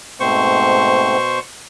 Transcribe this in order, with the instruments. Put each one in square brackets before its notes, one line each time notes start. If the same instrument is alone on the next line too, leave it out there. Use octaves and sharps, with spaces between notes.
[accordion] G#2 A3 C4 [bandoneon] B2 C5 C#6